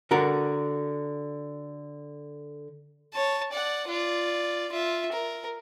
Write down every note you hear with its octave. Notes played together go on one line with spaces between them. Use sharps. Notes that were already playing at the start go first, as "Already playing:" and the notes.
D3 F#4 A#4
C#5 A5
D5 F#5
F4 D5
F4 E5
A#4